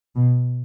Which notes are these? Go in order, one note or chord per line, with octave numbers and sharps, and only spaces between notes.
B2